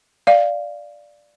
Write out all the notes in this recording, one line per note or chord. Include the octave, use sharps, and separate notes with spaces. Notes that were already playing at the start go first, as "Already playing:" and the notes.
D5 F5